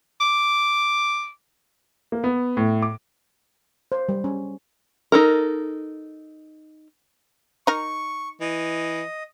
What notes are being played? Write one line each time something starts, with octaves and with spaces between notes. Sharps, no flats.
D6
A#3
B3
A2
D6
C5
G3
C#4
D#4 A4 A#4
D#4 A#4 C#6
E3 D#5